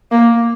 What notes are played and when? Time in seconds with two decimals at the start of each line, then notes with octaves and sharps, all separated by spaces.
0.12 A#3